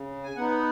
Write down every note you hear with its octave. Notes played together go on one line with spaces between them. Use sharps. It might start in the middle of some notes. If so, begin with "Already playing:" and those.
Already playing: C#3
G#5
B3 D#4 F#5